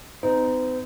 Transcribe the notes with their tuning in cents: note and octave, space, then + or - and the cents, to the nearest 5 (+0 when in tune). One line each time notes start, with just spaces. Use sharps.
C4 -45 D#4 +0